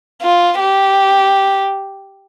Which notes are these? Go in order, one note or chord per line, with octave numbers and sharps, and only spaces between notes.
F4
G4